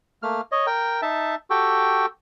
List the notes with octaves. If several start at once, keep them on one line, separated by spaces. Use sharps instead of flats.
A3 A#3 F6
C#5 D#5
A#4 G5
D#4 E5 A5
F#4 G4 A4 G5